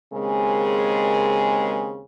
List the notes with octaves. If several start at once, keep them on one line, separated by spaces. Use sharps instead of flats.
D#2 C#3 G#3 C4 G#4 A#4